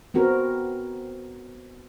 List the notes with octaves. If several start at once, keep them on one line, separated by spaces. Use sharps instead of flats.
B3 C4 F#4 A#4